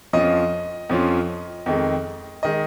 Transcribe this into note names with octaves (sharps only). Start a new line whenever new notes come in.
F2 F3 C#4 F4 D#5
F2 F3 C#4 F4
F2 D#3 G#3
D#3 G#3 D#5